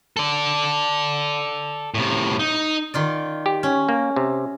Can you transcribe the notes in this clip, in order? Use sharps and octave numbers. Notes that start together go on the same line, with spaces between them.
A4 D5
A2 C3
D#4
D#3 F4 D5
G4
C#4
A#3
C3